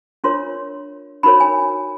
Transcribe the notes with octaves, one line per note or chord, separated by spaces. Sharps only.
D4 F4 A#4 C#5 C6
D#4 F#4 A#4 C#5 B5
G#5